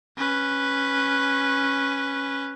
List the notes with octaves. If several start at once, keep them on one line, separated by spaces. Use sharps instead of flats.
C#4 B4